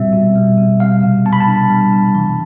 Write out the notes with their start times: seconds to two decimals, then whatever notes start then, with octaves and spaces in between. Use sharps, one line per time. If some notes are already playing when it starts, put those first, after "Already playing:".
Already playing: B2 G3 C4 E5
0.13 B2
0.35 G3
0.58 B2
0.80 G3 F5
1.03 C3
1.25 B3 A5
1.33 B5
1.40 A5
1.48 D4
1.70 G3
1.92 C3
2.15 E3